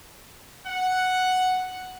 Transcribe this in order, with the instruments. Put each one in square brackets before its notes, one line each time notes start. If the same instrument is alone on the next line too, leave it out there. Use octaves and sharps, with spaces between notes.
[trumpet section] F#5